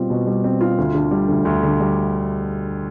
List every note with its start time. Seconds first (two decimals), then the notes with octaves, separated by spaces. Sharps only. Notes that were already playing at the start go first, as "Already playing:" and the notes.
Already playing: B2 G3 C4 F4
0.10 B2
0.26 G3
0.44 C4
0.61 F4
0.78 D2
0.94 D3
1.11 G3
1.28 D2
1.45 D2
1.63 D3
1.80 G3